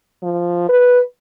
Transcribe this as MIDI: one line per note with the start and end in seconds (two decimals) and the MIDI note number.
0.23 0.65 53
0.69 0.99 71